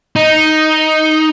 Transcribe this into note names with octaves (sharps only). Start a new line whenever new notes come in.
D#4